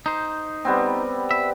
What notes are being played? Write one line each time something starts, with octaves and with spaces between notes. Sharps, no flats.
D#4 C5
G3 B3 C4
E5